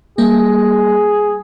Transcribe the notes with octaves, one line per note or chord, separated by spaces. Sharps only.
G3 A#3 G#4